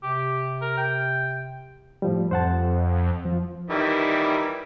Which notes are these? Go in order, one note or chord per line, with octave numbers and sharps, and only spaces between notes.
C3 G4
A#4
G5
A2 F3 G3
F2 C5 F#5 A5
F3
D#3 E3 G3